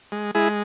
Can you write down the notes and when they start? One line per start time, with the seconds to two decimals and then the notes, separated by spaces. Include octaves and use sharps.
0.12 G#3
0.35 G#3 E4 G#4